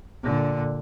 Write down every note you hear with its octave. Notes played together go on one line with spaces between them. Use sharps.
A#2 D3